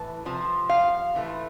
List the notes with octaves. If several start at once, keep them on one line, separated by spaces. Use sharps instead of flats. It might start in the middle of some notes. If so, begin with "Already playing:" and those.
Already playing: A2 E3 A5
C3 F3
F5
A2 E3 A3